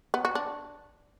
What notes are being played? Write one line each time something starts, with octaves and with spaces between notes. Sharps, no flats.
B3
F#4
D4